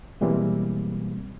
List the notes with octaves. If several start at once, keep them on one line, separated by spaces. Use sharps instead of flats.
B2 E3 G3 G#3 A#3 C4